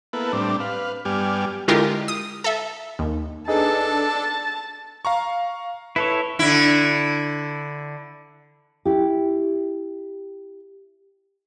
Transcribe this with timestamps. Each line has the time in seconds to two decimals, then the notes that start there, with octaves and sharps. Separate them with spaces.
0.13 A#3 B3 E4 A4 B4
0.32 A2 G3 C4 D4
0.60 B4 F5
1.05 G2 G3 B3 G4 G#5 F6
1.68 D3 G#3 E4 F4 G4 A#4
2.08 D#6
2.44 A4 E5
2.99 D#2
3.48 D4 D#4 G#4 A4 B4 A5
5.05 F5 A#5 C#6
5.96 E4 A4 B4 C#5
6.39 D3 E4
8.85 E4 G4